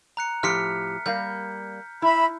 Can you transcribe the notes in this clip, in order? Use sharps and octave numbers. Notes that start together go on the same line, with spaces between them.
A#5 F#6 C#7
A2 F3 G4 F6 B6 C#7
G3 A#3 F5 G6
E4 E5 B5